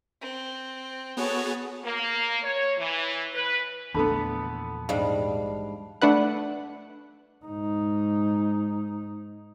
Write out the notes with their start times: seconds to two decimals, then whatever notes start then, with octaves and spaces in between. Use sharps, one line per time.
0.21 C4
1.17 B3 F#4 G#4 A4 C#5
1.84 A#3
2.43 C#5
2.78 E3
3.34 B4
3.94 A#1 E2 D3 A3 B3 A5 B5
4.89 G#2 G3 D4 F5
6.01 A3 D4 B4 F#5
7.45 G#2 D#4